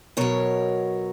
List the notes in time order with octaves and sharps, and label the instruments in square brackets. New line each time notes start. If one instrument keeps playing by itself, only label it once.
[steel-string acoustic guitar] B2 F#3 A#4 C#5